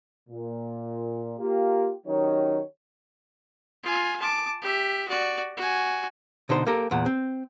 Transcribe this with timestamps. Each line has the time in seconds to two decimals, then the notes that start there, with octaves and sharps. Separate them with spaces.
0.29 A#2
1.39 A#3 F4 G4
2.07 D#3 F#3 C#4 D#4 G4 C#5
3.83 F4 G#5
4.20 A5 D6
4.62 G4 E5
5.08 F#4 D5
5.57 F#4 G#5
6.49 B2 D3 D#4 C5
6.67 A#3 G4 A4 A#4
6.91 E2 A#2 F#5
7.06 C4